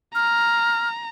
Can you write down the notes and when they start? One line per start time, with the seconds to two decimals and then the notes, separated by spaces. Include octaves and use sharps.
0.15 A#5 F6